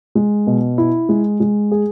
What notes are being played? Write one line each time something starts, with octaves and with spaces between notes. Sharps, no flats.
G#3
B2
E4
G#3
G#3
G#4